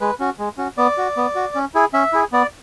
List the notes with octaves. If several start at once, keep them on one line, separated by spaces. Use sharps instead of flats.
G#3 B4
C#4 F#4
G#3
C#4 F#4
B3 D5
F#4
B3
F#4
C#4
E4 G#4
C#4 E5
E4 G#4
B3 D5